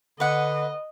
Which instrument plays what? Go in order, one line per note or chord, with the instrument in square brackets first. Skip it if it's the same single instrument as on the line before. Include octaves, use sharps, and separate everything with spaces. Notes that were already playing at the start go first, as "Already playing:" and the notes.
[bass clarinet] D3 [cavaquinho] B4 F#5 [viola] D#5